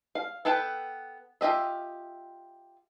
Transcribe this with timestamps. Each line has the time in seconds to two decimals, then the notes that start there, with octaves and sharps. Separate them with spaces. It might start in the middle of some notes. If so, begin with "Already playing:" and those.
0.15 F5
0.45 B3 A4 B4 G5
1.41 F4 G4 D#5 E5